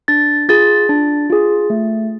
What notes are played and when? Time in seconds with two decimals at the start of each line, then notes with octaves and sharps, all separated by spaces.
0.08 D4 A6
0.49 F4 G#4 A6
0.89 D4
1.30 F4 G#4
1.70 A3